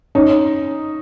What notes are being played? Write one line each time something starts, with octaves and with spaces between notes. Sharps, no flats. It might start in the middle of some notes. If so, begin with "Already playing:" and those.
C#4 D#4